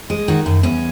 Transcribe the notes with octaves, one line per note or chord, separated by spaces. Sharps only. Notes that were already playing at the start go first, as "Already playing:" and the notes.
G#3
D#3 F#4
F#2
E2 C#4